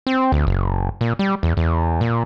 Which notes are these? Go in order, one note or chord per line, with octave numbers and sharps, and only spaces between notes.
C4
D2
F#1
A#2
G3
E2
E2
A#2